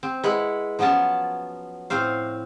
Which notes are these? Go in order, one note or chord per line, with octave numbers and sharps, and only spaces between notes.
C4
G#3 E4 B4 F#5
F3 F#3 B3 C#4 A5
A2 C4 C5 F5